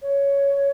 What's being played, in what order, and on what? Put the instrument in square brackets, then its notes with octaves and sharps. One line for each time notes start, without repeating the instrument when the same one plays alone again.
[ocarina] C#5